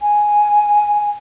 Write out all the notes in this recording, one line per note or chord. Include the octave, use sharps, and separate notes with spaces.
G#5